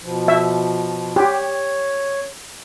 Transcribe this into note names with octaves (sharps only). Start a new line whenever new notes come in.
B2 F3
E5
G4 C#5